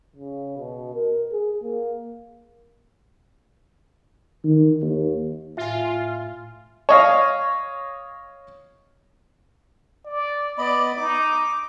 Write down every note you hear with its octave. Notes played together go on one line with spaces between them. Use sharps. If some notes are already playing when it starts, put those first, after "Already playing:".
C#3
B2
A#4
G#4
A#3
D#3
D#2
A2 F4 E5 G#5
C#5 D#5 F5
D5
B3 D5 D#5 B5
D#4 D6